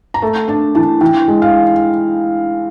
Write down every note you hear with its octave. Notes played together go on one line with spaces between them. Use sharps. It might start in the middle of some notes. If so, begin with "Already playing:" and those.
A#5
A3 A5
D4 A5
E3 A5
E3 G5
G#3
F5